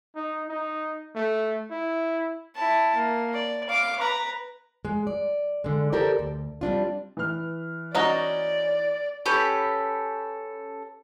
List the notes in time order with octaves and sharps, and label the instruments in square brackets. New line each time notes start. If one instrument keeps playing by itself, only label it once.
[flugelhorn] D#4
D#4
A3
E4
[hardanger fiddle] E4 A5
A#3
D5
F5 D6
B4 A#5
[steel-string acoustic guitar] G#3
D5
D3 G#3
G4 A4 A#4 C5 D5
D2
G3 C4 D4 F4
[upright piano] E3 F6
[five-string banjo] C#4 D#4 F#4 [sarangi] D5
[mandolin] C#4 G4 A4 B4